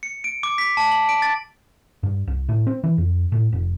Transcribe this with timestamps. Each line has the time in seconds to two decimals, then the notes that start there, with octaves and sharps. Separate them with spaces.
0.03 C#7
0.24 D7
0.43 D6
0.58 B6
0.77 A5
0.91 F#7
1.09 D7
1.22 A6
2.03 G2
2.27 C2
2.49 A2
2.67 C4
2.84 E3
2.98 F2
3.32 A2
3.52 F1